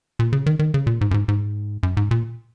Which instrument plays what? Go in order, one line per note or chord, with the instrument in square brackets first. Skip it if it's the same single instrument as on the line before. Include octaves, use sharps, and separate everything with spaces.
[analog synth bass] A#2
C#3
D#3
D#3
C#3
A#2
G#2
F#2
G#2
G#2
F#2
G#2
A#2